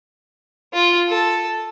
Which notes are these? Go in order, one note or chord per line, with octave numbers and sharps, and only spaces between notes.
F4
A4